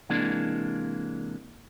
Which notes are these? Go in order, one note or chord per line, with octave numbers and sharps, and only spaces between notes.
C3 E3 G#3 A#3 D4